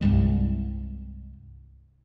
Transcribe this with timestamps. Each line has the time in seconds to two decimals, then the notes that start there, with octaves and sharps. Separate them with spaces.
0.01 C2 G2 G3 G#3